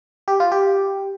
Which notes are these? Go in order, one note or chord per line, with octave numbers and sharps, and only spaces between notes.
G4
F4
G4